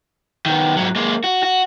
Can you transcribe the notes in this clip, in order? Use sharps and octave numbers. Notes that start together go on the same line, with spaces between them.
D#3 B3
G#2 F#3
G#3 A#3
F#4
F#4